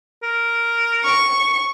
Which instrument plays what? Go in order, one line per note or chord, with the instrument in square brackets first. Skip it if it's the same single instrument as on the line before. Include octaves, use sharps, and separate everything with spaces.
[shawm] A#4
[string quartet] C#6